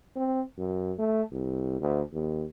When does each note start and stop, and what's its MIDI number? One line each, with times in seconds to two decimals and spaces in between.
0.16 0.41 60
0.58 0.93 42
0.99 1.22 57
1.32 1.76 36
1.81 2.01 38
2.12 2.44 39